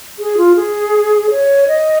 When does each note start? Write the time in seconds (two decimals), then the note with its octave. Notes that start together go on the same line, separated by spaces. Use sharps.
0.19 G#4
0.37 F4
0.56 G#4
1.30 C#5
1.67 D#5